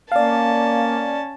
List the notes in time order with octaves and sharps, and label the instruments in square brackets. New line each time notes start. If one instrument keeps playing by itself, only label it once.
[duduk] A#3 [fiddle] C#4 A5 [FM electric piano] D5 F5